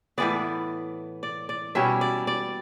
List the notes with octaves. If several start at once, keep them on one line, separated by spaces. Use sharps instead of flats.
A2 E3 B3 D5
D5
D5
B2 G3 C#4 E4 E5
D5
D5